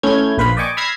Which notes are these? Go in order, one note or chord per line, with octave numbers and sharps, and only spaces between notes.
A3 C#4 E4 F6 G6 G#6
A#1 A#3 B4 C5 F5 B5
D5 D#5 G5 G#5 C#6 D6
B5 E6 F6 G#6 A#6 C7